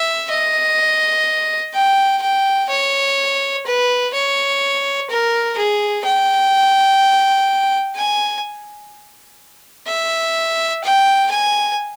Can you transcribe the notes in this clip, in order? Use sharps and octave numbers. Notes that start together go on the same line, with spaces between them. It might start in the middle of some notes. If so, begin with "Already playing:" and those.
Already playing: E5
D#5
G5
G5
C#5
B4
C#5
A#4
G#4
G5
G#5
E5
G5
G#5